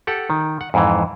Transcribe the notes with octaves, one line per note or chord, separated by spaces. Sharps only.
G4 A4 F#5
D#3
F#5
F2 G#2 E3